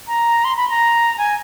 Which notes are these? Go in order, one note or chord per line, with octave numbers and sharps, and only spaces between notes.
A#5
C6
B5
A#5
G#5